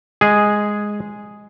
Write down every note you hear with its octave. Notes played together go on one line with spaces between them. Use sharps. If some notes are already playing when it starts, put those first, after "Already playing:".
G#3 G#4